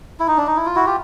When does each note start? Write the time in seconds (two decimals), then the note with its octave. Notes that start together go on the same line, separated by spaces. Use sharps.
0.20 E4
0.28 D#4
0.37 D4
0.47 D#4
0.56 E4
0.66 F4
0.75 E4 F#4
0.86 F4 G4